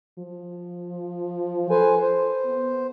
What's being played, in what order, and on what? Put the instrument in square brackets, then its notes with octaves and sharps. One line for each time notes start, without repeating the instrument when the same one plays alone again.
[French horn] F3
[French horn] A4 [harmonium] B4 C5 G#5
[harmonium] C5
[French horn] B3